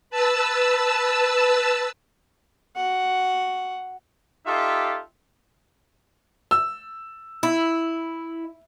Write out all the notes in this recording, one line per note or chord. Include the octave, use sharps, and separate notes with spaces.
B4 A5 E6
F#4 F#5
D#4 F4 G4 A4 E5 C6
E6
E4